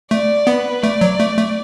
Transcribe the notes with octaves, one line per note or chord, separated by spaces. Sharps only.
A3 D5
B3 B4
A3 D5
F#3
A3
A3